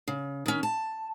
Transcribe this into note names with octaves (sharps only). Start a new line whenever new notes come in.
C#3
D#3 C#4
A5